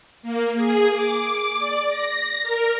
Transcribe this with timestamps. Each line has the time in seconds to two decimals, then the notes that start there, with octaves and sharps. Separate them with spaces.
0.22 A#3
0.54 G#4
0.92 D6
1.26 D6
1.59 D5
1.88 A#6
2.43 A#4